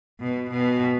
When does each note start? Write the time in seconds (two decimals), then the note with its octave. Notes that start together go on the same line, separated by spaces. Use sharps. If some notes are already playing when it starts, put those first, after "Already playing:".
0.20 B2
0.51 B2